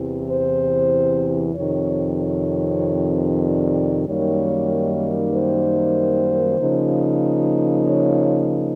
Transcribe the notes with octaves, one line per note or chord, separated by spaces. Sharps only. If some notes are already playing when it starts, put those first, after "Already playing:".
Already playing: E2 C3 E3
C5
F2 C3 D#3 C#5
C#5
D5
F#2 D#3 G3 A#3 D#4 C#5
C5
C#3 F3 A#3 D#4
C#5